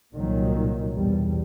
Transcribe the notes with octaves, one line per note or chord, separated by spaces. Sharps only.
C2 A#2 D#3 F#3
B1 E2 G3